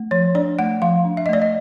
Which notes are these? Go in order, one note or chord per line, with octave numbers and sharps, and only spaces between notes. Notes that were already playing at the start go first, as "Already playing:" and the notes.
Already playing: A3
F3 C#5
D4 D5
A3 F#5
F3 F5
D4
E5
D#5
A3 D5
D#5